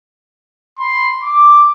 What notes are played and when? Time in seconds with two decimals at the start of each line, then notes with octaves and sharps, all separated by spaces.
0.78 B5 C6
1.23 D6